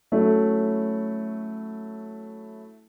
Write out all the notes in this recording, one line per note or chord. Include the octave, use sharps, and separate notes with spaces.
F#3 A3 C#4 E4